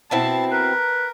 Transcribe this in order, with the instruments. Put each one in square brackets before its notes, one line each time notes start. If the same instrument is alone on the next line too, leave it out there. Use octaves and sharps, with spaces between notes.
[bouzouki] B2 C4 E4 [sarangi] A5
[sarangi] A#4 [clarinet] B4